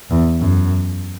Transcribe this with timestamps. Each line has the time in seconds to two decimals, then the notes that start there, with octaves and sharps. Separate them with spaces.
0.10 E2
0.41 F#2